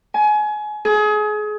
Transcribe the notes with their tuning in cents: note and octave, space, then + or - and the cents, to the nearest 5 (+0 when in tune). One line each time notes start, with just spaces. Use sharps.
G#5 +30
G#4 +30